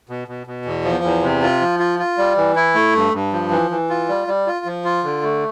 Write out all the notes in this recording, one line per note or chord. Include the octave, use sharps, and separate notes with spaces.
B2
B2
B2
E2
F3
E2
C3
F4
F3
F4
F4
G3
E3
E4
A3
G2
G2
F3
E3
E3
F4
G3
G3
F4
F3
F4
D3
A3